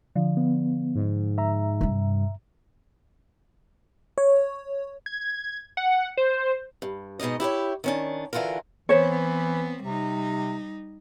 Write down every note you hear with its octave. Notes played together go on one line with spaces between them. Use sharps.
D3 F3
B3
G#2
E5 A#5
G2 C3
C#5
G#6
F#5
C5
G2
G#2 B2 D#3 D#4 D#5
E4 G4 B4 C#5
D#3 C#4 D4
D3 E3 F4 F#4 A#4
E3 B3 C4 C5 C#5
C3 G3 D#4